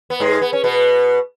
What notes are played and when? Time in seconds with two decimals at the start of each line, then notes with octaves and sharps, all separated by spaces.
0.10 B3
0.20 G#2 G#3
0.41 B3
0.53 C#4
0.64 B2 B3